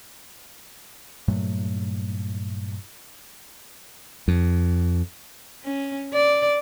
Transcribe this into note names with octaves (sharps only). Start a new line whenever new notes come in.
G2 A#2 F#3 A3
F2
C#4
D5